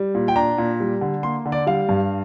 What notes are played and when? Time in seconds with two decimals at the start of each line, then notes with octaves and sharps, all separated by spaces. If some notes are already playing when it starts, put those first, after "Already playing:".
Already playing: G3
0.15 A#2
0.28 G5
0.36 D4 A#5
0.58 A#2
0.80 G3
1.01 D3
1.23 A#3 C6
1.45 D3
1.52 D5
1.67 G3 F5
1.89 G2